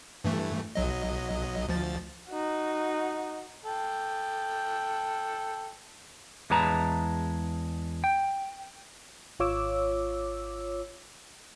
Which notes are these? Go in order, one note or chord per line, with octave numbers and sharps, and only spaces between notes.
G2 E3 A3
B1 F#3 D#5
D2 F3 A6
D#4 F#4
A4 G5
E2 G#3 B4 A5 A#5
G5
G#1 F4 C#5 D6 E6